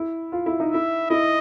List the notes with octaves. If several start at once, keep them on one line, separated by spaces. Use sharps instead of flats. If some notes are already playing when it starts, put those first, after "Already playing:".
Already playing: E4
F4
E4
D#4
E4 E5
E4 D#5